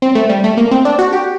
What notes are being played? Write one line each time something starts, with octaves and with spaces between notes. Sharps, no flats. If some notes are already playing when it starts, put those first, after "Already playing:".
C4
A3
G3
A3
A#3
C4
D4
F#4
G4